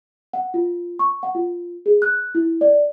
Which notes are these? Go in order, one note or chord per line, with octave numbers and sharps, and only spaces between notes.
F#5
F4
C#6
F#5
F4
G#4
F#6
E4
D5